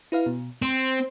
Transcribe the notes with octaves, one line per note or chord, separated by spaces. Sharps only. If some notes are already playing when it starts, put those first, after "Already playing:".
E4 B4 F5
B2
C4 C5 C6